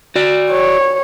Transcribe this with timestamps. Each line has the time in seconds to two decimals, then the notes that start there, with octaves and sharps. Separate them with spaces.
0.16 F#4 D5
0.51 C#5